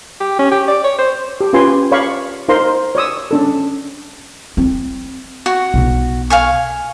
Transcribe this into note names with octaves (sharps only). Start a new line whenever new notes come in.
G4
C#4
G4
D5
C#5
C5
G4
C#4 F4 G4 B4 G#5 C6
C#5 D5 F5 B5 C#6
D#4 A#4 C5 F5 A#5 C6
C#5 D5 D#6 E6
C#4 D4 A4
C4
F#4
B1
F5 G#5 C#6